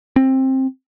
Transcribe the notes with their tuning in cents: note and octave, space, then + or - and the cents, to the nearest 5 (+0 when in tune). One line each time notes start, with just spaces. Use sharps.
C4 +15